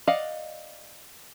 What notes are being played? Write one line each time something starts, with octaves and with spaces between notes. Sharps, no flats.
D5 D#5 F5 F#5